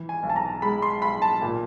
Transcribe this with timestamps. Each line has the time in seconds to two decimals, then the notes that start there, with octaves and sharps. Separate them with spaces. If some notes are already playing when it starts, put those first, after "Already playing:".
Already playing: E3
0.09 G#5
0.23 B1
0.29 A5
0.36 A#5
0.62 G#3 B5
0.82 C6
1.02 B1 B5
1.22 A5
1.42 A#2